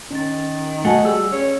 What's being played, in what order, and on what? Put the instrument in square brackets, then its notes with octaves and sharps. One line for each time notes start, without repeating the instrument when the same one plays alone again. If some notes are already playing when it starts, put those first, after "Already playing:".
[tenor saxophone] D#3 [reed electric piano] C#4 A6
[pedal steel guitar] A3 [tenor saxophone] F#4 [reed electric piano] D#5 G#5 A5
[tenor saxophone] G3 [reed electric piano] G#4 [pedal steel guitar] E6
[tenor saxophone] C#4